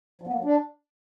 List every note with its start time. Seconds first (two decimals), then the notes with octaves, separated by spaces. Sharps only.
0.22 F3
0.27 B3
0.33 A#3
0.38 F#3
0.44 D4